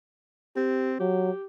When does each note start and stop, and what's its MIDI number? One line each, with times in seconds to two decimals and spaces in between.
0.56 0.98 60
0.56 0.94 67
1.00 1.31 54
1.00 1.46 67